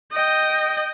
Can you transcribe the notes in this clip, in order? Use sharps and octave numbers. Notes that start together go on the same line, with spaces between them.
D#5 G5